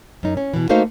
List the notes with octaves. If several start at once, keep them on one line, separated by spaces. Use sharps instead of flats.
F#2 D#4
C#4
B2 E3
A3 A#3 D#4 F#4 C5 F5